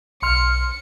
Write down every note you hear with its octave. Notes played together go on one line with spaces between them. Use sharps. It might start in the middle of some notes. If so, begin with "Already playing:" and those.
B1 C6 F6 C#7